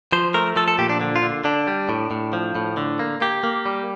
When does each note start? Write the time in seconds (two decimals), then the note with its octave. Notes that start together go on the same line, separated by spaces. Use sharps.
0.12 F3 C5
0.34 A3 A#4
0.56 F3 A4
0.68 A4
0.78 A#2 G4
0.89 D4
1.01 D3
1.16 F4
1.23 D3
1.44 D3 D4
1.67 G3
1.89 A2
2.11 A2
2.33 F3
2.55 A2
2.77 D3
2.99 A#3
3.21 A#3 G4
3.43 A#3
3.66 G3